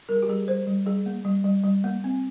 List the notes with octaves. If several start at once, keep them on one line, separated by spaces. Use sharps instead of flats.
G3 A#4
G#4
G4
G3 G#4
G3 C5
G3
G3 G#4
A#3
G3
G3
G3
A#3
C4